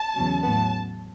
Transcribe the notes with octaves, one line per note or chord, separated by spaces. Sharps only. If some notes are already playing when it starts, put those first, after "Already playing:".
Already playing: A5
E2 C#3 F#3
A2 F#3 B3 A5